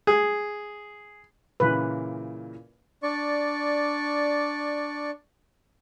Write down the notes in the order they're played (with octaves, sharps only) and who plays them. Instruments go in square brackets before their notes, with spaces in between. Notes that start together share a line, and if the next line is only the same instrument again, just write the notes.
[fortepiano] G#4
[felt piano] A#2 C#3 E3 [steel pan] B4
[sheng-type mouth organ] D4 D5 C#6